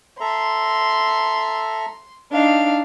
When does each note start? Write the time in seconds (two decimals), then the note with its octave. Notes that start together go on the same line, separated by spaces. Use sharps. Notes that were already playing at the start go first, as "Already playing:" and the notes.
0.20 A4 E5 A#5 C6
2.31 D4 D#4 F5